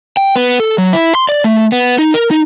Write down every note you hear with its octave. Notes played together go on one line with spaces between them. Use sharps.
G5
B3
A4
F#3
E4
C6
D5
A3
B3
D#4
A#4
D#4